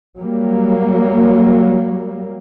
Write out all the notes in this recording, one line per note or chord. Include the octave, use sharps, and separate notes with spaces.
F#3 G3 A#3